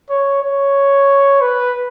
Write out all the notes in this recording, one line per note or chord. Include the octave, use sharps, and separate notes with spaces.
C#5
C#5
B4